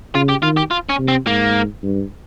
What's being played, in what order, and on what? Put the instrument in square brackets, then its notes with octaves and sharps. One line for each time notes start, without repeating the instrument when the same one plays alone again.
[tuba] C#3 [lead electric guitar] F4
[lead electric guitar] G4
[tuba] D#3 [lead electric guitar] F4
[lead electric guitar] G4
F4
C#4
[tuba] C3
[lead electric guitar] C4
[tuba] G#2 [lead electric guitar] A#3
[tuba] G2